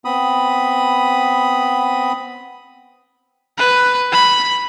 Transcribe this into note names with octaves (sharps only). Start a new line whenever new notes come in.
B3 C4 B5 D#6
B4
B5